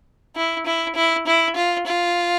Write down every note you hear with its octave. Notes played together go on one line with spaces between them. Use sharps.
E4
E4
E4
E4
F4
F4